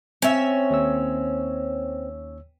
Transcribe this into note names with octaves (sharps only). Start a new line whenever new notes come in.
C4 C#4 E5
D#2 C#5 E6